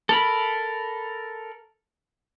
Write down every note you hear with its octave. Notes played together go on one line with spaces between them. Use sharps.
A4 A#4 B5